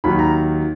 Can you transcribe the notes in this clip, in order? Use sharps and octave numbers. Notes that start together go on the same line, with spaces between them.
D#2 D#3 F#3 B5
A#5